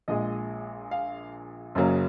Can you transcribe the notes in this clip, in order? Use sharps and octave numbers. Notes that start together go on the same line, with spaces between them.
A#1 A#2 G#3 D#5
F5
F#1 F#2 C#3 F#3 A#3